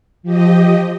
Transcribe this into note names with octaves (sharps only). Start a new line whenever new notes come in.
F3 G4 D#5